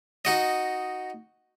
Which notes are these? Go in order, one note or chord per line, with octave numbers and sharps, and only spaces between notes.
D#4 F#4 D#5